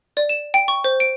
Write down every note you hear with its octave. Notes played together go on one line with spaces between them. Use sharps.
D5
E7
G5
C#6
C5
D7